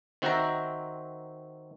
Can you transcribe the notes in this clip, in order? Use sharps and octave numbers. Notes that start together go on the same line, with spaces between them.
D#3 C4 F#4 C5 E5 A#5